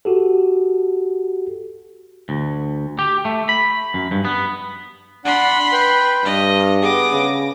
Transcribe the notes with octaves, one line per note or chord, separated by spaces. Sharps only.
F#4 G4 A4
D2
G4
A3
B5
F#2
G2
B3
D4 F#5 B5 C6
B4 G5
G2 D#5 F6
B3 G#4 D6 D#6 A#6
C#3